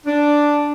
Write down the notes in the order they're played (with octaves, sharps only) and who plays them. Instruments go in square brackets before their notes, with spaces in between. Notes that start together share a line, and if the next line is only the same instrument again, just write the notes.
[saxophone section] D4